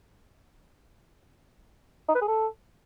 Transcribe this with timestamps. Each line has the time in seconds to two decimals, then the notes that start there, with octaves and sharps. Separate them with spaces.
2.08 D#4
2.15 B4
2.21 G#4
2.28 A4